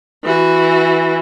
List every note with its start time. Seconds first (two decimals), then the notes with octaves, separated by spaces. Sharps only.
0.24 E3 F#4